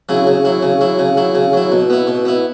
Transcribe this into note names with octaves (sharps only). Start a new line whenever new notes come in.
C#3 F#3 E4
C#3
F#3 E4
C#3
F#3 E4
C#3
F#3 E4
C#3
F#3 E4
B2
B3 E4
B2
B3 E4